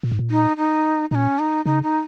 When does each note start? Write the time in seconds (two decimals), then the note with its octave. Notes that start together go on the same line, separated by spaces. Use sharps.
0.03 A#2
0.12 G#2
0.19 A#2
0.31 D#4
0.57 D#4
1.11 A#2 C#4 D#4
1.39 D#4
1.65 C#3 D#4
1.83 D#4